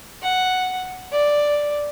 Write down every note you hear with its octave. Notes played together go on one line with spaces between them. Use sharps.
F#5
D5